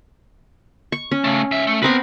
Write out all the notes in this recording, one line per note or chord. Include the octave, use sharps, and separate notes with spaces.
C#6
C#4
C#3 A3
C#2 E5
A3
B3 C4 B4 A#5 B5